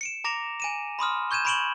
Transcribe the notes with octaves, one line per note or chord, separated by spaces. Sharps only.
C#7 D7 E7
A#5 D6 A#6 D7 F7
G#5 D#7 E7
B5 C6 D#6 F6
C#6 G6 G#6 D#7 E7
B5 C#6 D7 E7 F#7 G7